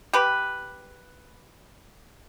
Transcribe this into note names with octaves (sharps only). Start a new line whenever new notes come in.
G4 B4